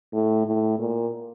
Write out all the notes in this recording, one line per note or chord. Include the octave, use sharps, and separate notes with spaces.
A2
A2
A#2